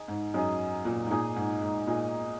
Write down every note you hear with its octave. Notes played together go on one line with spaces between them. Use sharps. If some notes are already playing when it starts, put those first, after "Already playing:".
Already playing: D#4 G#4 D#5
G#2
F#2 D#4 G#4 D#5
A#2
G#2
A#2 D#4 G#4 D#5
G#2
G#2
A#2 D#4 G#4 D#5